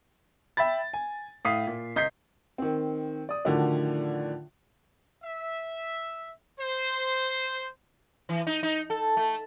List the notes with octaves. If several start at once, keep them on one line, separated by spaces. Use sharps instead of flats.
E5 G5 B5 A6
G#5
A2 F5 D#6 B6 C7
A#2
C#2 D#5 G6 B6 C7
D#3 C4
D5 D#6
A2 D3 D#3 F3 D4 F#4
E5
C5
E3
D#4
D#4
A4
A3